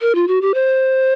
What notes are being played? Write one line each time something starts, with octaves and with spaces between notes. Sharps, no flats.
A#4
F4
F#4
G4
C5